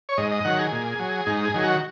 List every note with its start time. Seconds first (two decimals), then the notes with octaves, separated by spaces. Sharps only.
0.09 C#5
0.18 G#2 D#5
0.32 D#5
0.45 D#3 F#3 F#5
0.59 G#4
0.72 A#2
0.99 F#3
1.27 G#2 D#4
1.45 G#4
1.54 D#3 F#3
1.63 F#4